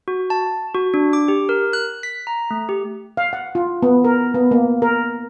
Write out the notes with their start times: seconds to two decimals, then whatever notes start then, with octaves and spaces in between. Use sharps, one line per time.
0.08 F#4
0.30 A5
0.74 F#4
0.94 D4
1.13 D6
1.28 G4
1.49 A#4
1.73 F#6
2.03 B6
2.27 A#5
2.51 A3
2.69 G4
3.17 F5
3.33 F#5
3.55 F4
3.82 B3
4.04 A#4
4.34 B3
4.51 A#3
4.82 A#4